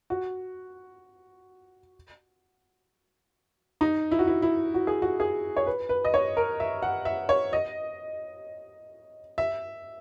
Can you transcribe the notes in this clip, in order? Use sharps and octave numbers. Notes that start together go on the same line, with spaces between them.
F#4
D#4
E4
F#4
E4
E4
F#4
G#4
F#4
G#4
C#5
B4
B4
D#5
C#5
A#4
E5
F#5
E5
C#5
D#5
E5